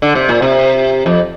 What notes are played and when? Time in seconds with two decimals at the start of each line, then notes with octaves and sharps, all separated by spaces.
0.02 D3
0.15 C3
0.29 A#2
0.42 C3
1.06 F2